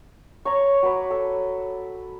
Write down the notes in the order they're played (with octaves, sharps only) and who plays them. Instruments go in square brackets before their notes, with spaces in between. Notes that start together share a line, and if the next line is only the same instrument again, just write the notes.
[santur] C#5 A#5 C#6
F#3 B4 D6
A4